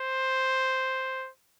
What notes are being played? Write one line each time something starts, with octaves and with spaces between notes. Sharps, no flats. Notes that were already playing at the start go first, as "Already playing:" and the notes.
Already playing: C5